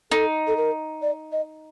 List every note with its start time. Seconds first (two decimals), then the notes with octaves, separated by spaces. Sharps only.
0.11 D#4 A4
0.47 A4
0.57 A#4
1.02 D5
1.32 D#5